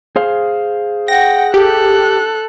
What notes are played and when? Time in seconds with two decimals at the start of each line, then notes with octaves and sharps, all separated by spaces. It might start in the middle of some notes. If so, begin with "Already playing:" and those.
0.16 G#4 C5 F5
1.08 F#5 G5 A#6
1.54 G4 A4 F#6